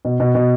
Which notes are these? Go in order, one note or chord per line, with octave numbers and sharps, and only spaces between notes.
B2
B2
B2